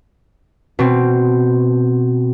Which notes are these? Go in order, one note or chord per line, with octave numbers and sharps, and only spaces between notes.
B2 C4